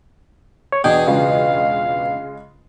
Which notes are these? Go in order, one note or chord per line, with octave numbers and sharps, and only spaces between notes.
C#5
E2 B2 D4 G#4 G5
C#3 G#3 F4 F5